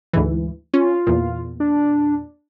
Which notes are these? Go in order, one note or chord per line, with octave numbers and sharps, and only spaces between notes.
D2 G#2 E3
C#4 F4
E2 A#2
D4